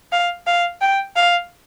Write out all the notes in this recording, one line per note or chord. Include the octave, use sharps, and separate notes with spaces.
F5
F5
G5
F5